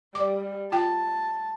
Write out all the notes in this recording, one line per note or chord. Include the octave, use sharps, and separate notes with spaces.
G3 D5 D6
F4 G5 A5